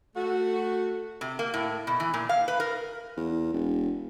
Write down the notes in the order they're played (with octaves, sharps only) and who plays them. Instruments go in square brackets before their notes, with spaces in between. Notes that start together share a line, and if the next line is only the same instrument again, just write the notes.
[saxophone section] A3 F#4
[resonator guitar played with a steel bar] C3
A#3
A2
B2
E3
A#2
F5
B4
A#4
[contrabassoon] E2
E1